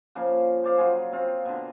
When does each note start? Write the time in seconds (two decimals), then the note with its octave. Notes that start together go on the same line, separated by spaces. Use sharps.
0.15 C#3 F3 A#3 F5
0.64 C5 D5 F5
0.78 C#3 F#3 F4 G#4
1.12 C4 F4
1.45 B2 D3